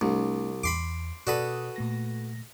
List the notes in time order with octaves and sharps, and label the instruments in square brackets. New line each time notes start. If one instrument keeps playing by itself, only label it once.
[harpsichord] C2 [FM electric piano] A3 D4 D5
[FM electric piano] E2 [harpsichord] B5 C6 D6
[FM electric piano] B2 D5 D#6 [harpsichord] F#4 A4 B4
[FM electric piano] A#2 A3 A#6